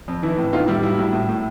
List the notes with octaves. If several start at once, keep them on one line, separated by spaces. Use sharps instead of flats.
F2
E3 E4
A2
A2 D#4 F4
G3 E4
F#3 E4
A2
A2
A2